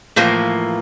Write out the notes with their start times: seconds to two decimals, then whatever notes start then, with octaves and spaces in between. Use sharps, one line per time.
0.16 A2 E3 F3 A#3